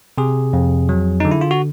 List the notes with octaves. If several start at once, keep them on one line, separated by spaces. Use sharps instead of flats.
C3 G#4
F2
F#3
D3 D#4
E4
F4
F#4